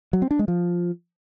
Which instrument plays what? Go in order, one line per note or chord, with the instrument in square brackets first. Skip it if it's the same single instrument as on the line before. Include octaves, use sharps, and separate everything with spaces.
[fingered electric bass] F#3
C4
D4
G#3
F3